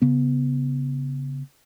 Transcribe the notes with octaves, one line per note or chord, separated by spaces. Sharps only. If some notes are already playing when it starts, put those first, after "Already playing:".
C#3 B3